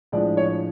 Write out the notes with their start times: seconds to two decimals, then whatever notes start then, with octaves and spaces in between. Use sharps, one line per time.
0.12 A2 F3 G#3 D4 D5
0.37 C#5